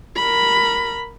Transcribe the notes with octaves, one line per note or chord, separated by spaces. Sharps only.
A#4 B5